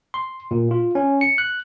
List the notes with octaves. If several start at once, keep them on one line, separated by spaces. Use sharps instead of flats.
C6
A#2
F4
C#4
C#7
F#6